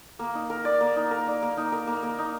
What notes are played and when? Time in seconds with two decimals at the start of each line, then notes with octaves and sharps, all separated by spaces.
0.19 A#3
0.35 D#4
0.50 A#4
0.65 D5
0.81 A#3
0.96 D#4
1.11 A#4
1.27 D5
1.43 A#3
1.57 D#4
1.72 A#4
1.87 A#3
2.03 A#3
2.18 D#4